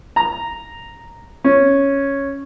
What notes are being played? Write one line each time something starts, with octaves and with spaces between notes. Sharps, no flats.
A#5
C#4